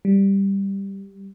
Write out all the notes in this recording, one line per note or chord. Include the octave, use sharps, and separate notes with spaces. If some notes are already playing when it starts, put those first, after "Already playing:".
G3